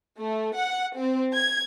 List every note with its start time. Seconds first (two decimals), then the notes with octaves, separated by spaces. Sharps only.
0.19 A3
0.56 F#5
0.97 C4
1.34 G#6